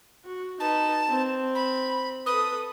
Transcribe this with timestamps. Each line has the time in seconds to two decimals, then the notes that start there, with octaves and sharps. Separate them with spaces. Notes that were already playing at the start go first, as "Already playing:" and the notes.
0.25 F#4
0.60 D#4 B4 A5
1.08 C4
1.55 B5
2.26 A4 B4 D#6